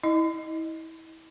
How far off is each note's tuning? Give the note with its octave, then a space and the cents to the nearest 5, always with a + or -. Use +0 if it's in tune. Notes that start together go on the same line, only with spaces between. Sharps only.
E4 -35 D#5 -10